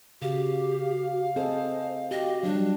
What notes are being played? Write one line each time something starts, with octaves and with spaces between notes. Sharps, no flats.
C#3 F#4 G4 F5
C4 G#4 A4 C5 D#5
F#4 G4 D#5
F#3 G3 D4